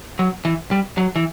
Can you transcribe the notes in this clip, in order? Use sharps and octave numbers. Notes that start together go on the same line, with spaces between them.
F#3
E3
G3
F#3
E3